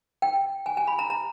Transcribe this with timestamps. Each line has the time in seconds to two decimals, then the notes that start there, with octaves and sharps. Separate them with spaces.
0.22 G5
0.66 G#5
0.77 G#5
0.87 B5
0.99 A#5
1.10 A#5